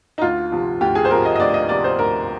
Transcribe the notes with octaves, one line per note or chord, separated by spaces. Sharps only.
D#4
D2 F4
C3 F3
D2 G4
G#4
C5
C3 F3 A#4
D#5
D#5
D2 D5
D#5
C3 F3 D5
C5
D2 A#4